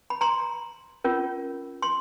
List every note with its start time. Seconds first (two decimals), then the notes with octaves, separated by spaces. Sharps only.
0.10 B5
0.21 A#5 C6
1.04 C#4 F4 A#4
1.82 C6